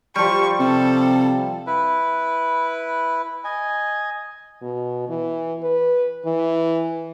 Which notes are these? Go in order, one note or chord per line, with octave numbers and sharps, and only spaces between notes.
F3 G3 C#6
C3 A4
E4 B4
D#5 G#5
B2
E3
B4
E3